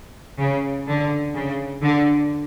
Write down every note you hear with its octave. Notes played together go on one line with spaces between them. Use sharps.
C#3
D3
C#3
D3